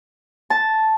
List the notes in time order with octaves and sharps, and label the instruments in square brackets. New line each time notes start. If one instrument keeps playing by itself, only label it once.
[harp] A5